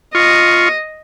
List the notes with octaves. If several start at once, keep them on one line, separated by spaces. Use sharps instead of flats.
F4 D#5 C#6